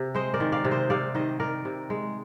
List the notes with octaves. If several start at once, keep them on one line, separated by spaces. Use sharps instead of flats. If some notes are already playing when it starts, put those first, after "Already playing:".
Already playing: C3
G#3 C5 D#5
A#4 D5
D#3
D5 F5
C3
C5 D#5
C3 D5 F5
D#3 C5 D#5
D#3 A#4 D5
C3
G#3